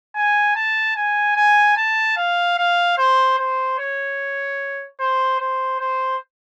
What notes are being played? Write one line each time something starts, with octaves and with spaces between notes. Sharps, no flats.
G#5
A5
G#5
G#5
A5
F5
F5
C5
C5
C#5
C5
C5
C5